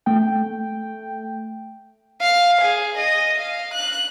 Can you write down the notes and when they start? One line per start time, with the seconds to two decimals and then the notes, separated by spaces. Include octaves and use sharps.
0.06 A3 G5
2.21 F5
2.61 G#4
2.97 D#5
3.39 F5
3.74 F#6